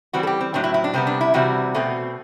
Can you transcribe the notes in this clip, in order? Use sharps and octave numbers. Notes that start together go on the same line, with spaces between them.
E3 G3 C4 F#4
A4
G4
C4
A2 F#3 C4 D4
E4
E4
D4
C3 G3 B3 C4
D4
E4
C3 E3 G3 C4 F#4
B2 A3 C4